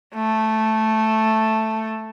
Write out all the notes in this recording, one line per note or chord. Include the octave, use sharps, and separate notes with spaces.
A3